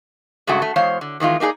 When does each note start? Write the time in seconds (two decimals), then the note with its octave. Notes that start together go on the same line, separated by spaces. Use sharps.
0.47 G2 C#3 G#3 A3 F#4
0.62 A3
0.76 E2 G#3 C5 C#5 F5
1.01 D3
1.20 E2 D#3 G#3 F4
1.40 A#3 D#4 G4 G#4 D5